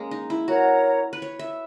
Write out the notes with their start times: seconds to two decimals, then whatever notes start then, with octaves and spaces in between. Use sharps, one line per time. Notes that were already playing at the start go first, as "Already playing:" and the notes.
Already playing: G#3 A#3 C#4
0.11 D#4
0.30 E4
0.48 F#4 A#4 C#5 F#5 A#5
1.13 B4
1.22 C#5
1.39 E5